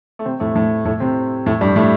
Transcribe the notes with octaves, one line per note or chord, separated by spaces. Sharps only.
A3
C3 C4
A2 A3
A2 A3
A2 A3
C3 C4
A2 A3
G2 G3
A2 A3